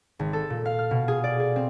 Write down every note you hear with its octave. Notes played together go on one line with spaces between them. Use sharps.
G#1
A4
A#2
F5
F6
B2
G#4
D5
G#4
C4